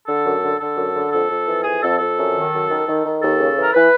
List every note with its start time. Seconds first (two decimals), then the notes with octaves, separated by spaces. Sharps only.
0.07 D3 A4
0.25 F#2
0.43 D3
0.60 D3 A4
0.77 F#2
0.95 D3
1.11 F2 A4
1.29 F2
1.47 E3
1.64 F2 G#4
1.82 F2 A4
1.99 F2 A4
2.16 F#2
2.35 D#3
2.52 F#2
2.69 D#3
2.86 D#3
3.04 D#3
3.22 D#2 A4
3.39 C#3
3.56 E3
3.62 A#4
3.74 E3 B4